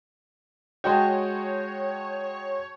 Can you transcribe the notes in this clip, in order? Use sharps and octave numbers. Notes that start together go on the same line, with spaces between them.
G#3 F#4 C#5 D#5 G5 A5 C6